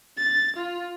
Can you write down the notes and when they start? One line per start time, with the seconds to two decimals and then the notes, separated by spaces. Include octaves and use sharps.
0.17 A6
0.57 F4